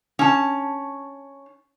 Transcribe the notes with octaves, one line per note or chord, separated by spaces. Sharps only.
C#4 A5